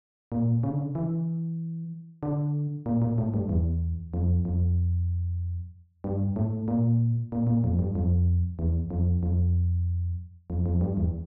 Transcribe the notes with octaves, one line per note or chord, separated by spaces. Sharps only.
A#2
C#3
D3
C#3
E3
D3
A#2
A#2
A2
G2
E2
F2
F2
G2
A2
A#2
A#2
A#2
F2
G2
F2
E2
F2
F2
F2
F2
G2
E2